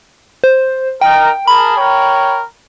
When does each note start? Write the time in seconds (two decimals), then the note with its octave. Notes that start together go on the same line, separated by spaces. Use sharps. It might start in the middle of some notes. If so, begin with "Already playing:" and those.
0.44 C5
1.01 D#4 A#4 G5
1.48 G#4 A#4 A5 B5
1.77 A#4 C#5 G5